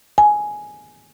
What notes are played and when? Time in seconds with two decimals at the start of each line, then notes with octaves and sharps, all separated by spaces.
0.18 G#5